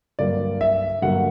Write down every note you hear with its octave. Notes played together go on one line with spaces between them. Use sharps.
G2 D3 F#3 A#3 D5
E5
G2 D3 F#3 A#3 F#5